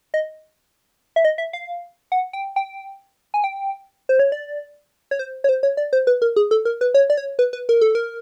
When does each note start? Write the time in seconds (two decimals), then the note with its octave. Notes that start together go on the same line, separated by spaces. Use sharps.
0.14 D#5
1.16 E5
1.25 D#5
1.38 E5
1.53 F5
2.12 F#5
2.33 G5
2.56 G5
3.34 G#5
3.44 G5
4.09 C5
4.19 C#5
4.32 D5
5.11 C#5
5.19 C5
5.44 C#5
5.49 C5
5.63 C#5
5.77 D5
5.93 C5
6.07 B4
6.22 A#4
6.36 G#4
6.51 A4
6.65 A#4
6.81 B4
6.94 C#5
7.10 D5
7.17 C#5
7.39 B4
7.53 B4
7.69 A#4
7.81 A4
7.95 A#4